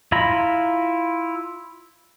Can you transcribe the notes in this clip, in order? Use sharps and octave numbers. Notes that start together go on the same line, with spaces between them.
E4 F4 A#5 B5